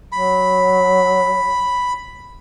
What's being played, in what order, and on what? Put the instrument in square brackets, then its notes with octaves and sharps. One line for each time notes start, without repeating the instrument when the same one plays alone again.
[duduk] F#3 [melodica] B5